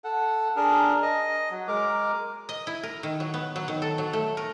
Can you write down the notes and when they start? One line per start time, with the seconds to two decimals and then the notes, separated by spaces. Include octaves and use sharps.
0.04 A4 F#5
0.56 D4 G#4 A#4
1.02 D#5
1.51 F#3
1.68 G#3 A#4 D6
2.49 D#5
2.67 E4
2.83 A#4
3.03 D#3
3.20 F#3
3.34 B3
3.56 F#3
3.68 D#3
3.82 A4
3.98 F#3
4.13 A3
4.37 A#4